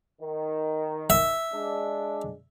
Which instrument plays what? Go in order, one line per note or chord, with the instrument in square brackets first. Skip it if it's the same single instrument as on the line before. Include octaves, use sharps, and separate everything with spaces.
[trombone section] D#3
[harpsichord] E5
[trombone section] G#3 D4